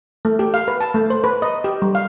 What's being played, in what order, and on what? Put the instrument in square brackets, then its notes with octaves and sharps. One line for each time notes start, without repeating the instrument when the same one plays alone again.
[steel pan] A3
G4
F5
B4
A5
A3
C5
B4
D#5
G4
G3
F5